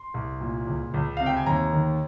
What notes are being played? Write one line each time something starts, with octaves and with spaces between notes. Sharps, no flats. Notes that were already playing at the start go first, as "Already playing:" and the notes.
Already playing: C6
C2
A#2
C#2
C#2
C3 F5
G5
G#5
D#2 A#5
D#3